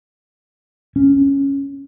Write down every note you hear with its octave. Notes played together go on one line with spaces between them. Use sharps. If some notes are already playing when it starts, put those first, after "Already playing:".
C#4